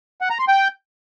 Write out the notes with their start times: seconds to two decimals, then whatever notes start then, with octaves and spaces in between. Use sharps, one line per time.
0.21 F#5
0.30 A#5
0.39 C6
0.48 G5